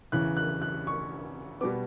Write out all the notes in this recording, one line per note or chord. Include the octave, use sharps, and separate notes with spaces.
E2 C#3 E3 F#6
F#6
F#6
C#6
B2 G3 B3 D6